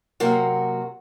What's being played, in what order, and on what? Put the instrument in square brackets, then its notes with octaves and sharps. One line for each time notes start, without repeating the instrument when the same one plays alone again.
[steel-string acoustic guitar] C3 F#3 A#3 F#4